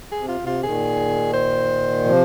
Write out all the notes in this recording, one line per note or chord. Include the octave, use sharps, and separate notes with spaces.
G#4
C3
F4
C3
F4
A#2 D#3 G#4
C5
C3 F3